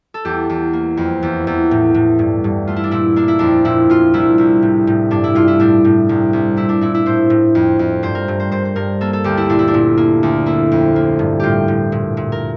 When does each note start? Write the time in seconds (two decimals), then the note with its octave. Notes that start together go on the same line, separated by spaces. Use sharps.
0.14 A4
0.25 E2 G4
0.49 E2
0.73 A#3
0.97 F2
1.23 E2
1.47 E2
1.71 A2
1.94 A2
2.19 G2
2.44 G2
2.67 A3 F4
2.76 E4
2.84 D4
2.91 A#2 E4
3.16 A#3 D4
3.28 E4
3.39 F2 D4
3.65 A#2 E4
3.90 A#2 F4
4.14 C2 E4
4.38 C2
4.62 A2
4.87 A2
5.11 G2 D4
5.24 E4
5.35 G2 F4
5.48 E4
5.60 A2 D4
5.85 A2
6.09 C2
6.33 C2
6.57 A#2 E4
6.69 D4
6.81 A#2 E4
6.94 E4
7.06 A2 C5
7.30 A2
7.55 F2
7.79 F2
8.03 G2 C5
8.15 A#4
8.28 G2
8.40 C5
8.52 G2 C5
8.65 C5
8.76 G2 A#4
9.01 A#3 A4
9.13 A4
9.24 D2 G4
9.37 E4
9.49 A#2 D4
9.59 E4
9.68 D4
9.74 A#2
9.97 A#3
10.23 D2
10.46 A#3 E4
10.72 F2
10.96 A#3
11.19 G2
11.40 A2 F4 G4
11.68 A2
11.92 A#2
12.17 A#2
12.32 A#4